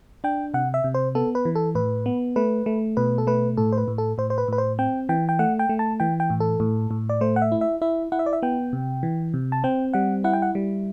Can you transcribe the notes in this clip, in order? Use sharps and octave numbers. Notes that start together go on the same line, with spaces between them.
D4 G5
C3 F#5
E5
C3
C5
B3 A4
B4
E3
A4
A2 B4
B3
A3 B4
A3
B2 B4
A4
A3 B4
A2 A4
C5
B4
A2
A4
A2 C5
C5
B4
A2 B4
C5
C4 G5
E3 G5
G5
A3 F#5
G5
A3
A5
E3 G5
G5
A2
A4
A2
A2
D5
A3 C5
F#5
E5
E4
E5
E4 E5
E4 F#5
E5
D5
E5
B3 G5
C3
E3
C3
A5
C4 G5
G3 F#5
E4 F#5
G5
F#5
G3